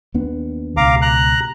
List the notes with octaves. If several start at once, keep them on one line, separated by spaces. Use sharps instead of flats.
D#2 B3 D4
C#2 B2 F5 A#5 D6
A#5 F#6